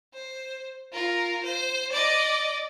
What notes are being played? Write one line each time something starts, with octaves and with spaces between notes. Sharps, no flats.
C5
F4 A#4
C5
D5 D#5